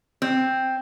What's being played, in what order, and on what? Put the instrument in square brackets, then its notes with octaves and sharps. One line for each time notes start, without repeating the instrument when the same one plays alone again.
[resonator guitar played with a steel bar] C4